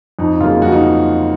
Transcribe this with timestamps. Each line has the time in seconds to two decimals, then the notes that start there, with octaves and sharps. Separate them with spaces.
0.19 F2 D#4
0.40 C#3 F#3 A#3 F4
0.62 F2 F#4
0.72 D#4